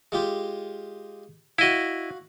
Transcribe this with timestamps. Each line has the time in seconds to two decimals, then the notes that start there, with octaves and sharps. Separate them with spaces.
0.12 G#3 F4 G4
1.58 E4 F#4 D#5 F5